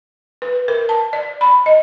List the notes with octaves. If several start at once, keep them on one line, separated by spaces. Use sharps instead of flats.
B4
A#4
A5
D5
B5
D#5